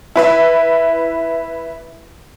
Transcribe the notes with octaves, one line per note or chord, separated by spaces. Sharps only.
E4 B4 E5